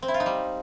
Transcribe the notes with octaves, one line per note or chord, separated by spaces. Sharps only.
C4
E4
F4
D#4
G3